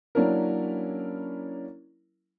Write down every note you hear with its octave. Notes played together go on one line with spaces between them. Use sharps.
F#3 A#3 C#4 D4 E4 A#4